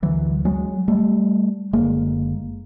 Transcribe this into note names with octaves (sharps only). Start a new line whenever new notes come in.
D2 D3 E3 F#3
F#3 G#3
G3 A3
F#1 F#2 D3 G#3 A#3